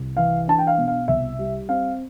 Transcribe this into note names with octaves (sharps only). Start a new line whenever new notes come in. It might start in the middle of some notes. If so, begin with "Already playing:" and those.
Already playing: C2
E3 F5
D4 A5
G5
F5
B2
F5
C2 E5
G3
C4 F5